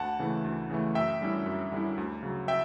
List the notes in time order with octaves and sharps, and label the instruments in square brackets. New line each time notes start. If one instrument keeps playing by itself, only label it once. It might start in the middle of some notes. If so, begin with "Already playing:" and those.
Already playing: [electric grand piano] D2 F#5 A5
C#3 E3 A3
D2
C#3 E3 A3
F#2 E5 G5
D3 G3 C#4 E4
F#2
D3 G3 C#4 E4
D2
C#3 F#3
E5 G5